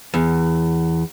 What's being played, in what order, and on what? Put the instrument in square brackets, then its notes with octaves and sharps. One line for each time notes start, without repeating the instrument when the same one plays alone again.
[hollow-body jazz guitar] E2